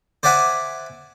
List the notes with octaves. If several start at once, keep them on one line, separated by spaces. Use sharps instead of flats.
C5 D5 E5 F#5 G#5